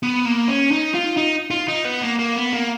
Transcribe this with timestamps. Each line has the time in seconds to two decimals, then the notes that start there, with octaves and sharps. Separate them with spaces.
0.03 B3
0.26 A#3
0.48 C#4
0.71 D#4
0.94 F4
1.17 D#4
1.51 F4
1.68 D#4
1.85 B3
2.02 A#3
2.19 A#3
2.36 B3
2.53 A#3